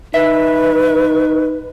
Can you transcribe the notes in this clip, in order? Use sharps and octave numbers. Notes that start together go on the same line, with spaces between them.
D#4 B4 E5